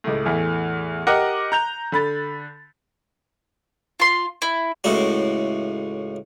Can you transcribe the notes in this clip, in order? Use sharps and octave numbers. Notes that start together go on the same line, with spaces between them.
C#2 A2
E2 A2 E3
G4 A#4 D#5 F#5 D6 F#6
A#5 G6 F7
D3 B5 A6
F4 C6
E4
C#2 A2 F#4